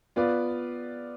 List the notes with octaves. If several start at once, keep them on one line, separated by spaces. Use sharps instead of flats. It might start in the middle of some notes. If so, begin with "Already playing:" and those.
B3 F4 B4 D5